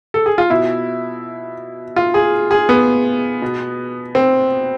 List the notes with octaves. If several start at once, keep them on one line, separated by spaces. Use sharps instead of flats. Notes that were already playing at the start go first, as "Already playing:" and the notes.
A4
G#4
F4
B2 E4
F4
G#4
G#4
B3
B2
C4